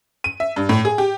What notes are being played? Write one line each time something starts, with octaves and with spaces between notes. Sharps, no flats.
D#7
E5
G2
A2
G#4
G4